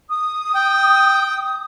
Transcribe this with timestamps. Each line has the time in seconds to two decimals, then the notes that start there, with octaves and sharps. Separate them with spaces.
0.09 D#6
0.55 G5